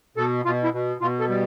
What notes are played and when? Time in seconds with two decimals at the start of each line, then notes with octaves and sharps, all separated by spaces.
0.17 B2 A4
0.45 B2 F4
0.64 E4
0.73 B2
1.01 B2 F4
1.20 A4
1.29 G3